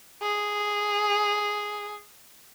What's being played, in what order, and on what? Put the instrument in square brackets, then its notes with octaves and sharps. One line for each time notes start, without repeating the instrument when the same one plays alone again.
[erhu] G#4